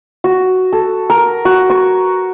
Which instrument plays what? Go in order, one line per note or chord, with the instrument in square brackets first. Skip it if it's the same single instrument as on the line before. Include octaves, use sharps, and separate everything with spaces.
[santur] F#4
A4
A#4
F#4
C#6